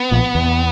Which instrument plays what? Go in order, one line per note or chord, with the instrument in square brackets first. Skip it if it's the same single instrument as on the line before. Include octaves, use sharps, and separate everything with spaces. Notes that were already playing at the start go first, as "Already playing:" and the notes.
Already playing: [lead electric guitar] B3
[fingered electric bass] A#1 A#2
E2